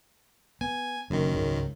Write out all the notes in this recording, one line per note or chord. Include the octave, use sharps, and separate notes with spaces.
B3 G#5
F#1 F#2 D3 D#3
C#2 G#2 C#3